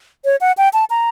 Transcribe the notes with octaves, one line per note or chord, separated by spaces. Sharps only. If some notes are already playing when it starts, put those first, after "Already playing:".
C#5
F#5
G5
A5
A#5